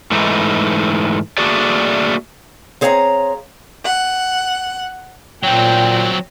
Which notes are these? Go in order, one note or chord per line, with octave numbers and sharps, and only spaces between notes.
G#2 E3 A3 D#4
A3 A#3 D4 F#4 G#4 D5
C4 G#4 C#5 F5 G5 A#5
F#5
A#2 F#3 C4 G5